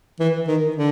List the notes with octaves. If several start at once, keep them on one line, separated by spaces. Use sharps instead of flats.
E3
D#3
D3